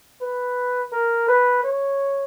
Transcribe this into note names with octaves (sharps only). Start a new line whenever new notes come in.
B4
A#4
B4
C#5